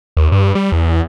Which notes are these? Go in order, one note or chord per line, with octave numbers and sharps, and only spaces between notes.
D#2
G2
G3
E2